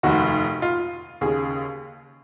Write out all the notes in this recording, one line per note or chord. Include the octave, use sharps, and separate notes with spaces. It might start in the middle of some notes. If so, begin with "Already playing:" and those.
F1 D#2 D#3 F#4
F4
D#2 C#3 G#4